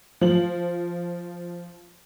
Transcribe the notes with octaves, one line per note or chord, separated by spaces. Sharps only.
F3 F#7